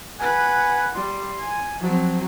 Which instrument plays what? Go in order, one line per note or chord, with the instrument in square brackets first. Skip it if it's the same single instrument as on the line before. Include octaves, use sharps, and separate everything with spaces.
[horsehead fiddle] B4 F#5 [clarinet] G#5
[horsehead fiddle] G3 [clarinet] C6
[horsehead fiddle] G#5
[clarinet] F3 [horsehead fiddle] F#3 C4